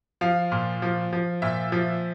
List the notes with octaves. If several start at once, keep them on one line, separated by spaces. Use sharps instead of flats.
F3 F5
A#2
F3
F3
A#2 E5
F3